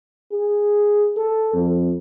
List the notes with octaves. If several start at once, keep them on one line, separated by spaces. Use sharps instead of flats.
G#4
A4
F2